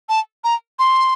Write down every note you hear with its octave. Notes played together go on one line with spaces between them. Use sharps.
A5
A#5
C6